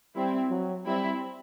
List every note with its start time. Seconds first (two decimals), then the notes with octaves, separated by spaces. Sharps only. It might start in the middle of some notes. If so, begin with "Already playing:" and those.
0.16 G3 C4 E4
0.50 F#3
0.86 G3 C4 E4